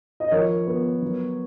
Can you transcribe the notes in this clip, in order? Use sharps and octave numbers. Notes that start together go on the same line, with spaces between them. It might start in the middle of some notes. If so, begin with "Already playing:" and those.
D#5
F3 A#4 C#5
B3
F#3